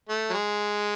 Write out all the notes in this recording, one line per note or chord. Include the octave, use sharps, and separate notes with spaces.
A3
F#3
G#3